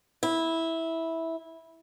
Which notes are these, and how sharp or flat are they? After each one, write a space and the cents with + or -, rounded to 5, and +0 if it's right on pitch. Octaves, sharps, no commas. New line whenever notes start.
E4 -10